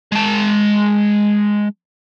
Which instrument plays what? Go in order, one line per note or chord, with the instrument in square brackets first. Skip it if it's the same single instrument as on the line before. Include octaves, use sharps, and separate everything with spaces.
[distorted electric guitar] G#3 A5